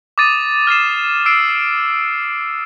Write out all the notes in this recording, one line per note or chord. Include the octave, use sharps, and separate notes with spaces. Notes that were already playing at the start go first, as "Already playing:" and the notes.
D6 D#6 A6 D#7
F6 A6 C7 E7
E6 C7 D7